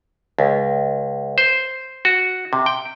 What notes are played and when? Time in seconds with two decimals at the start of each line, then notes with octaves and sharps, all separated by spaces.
0.39 C#2
1.38 C5
2.05 F#4
2.53 C3
2.66 G5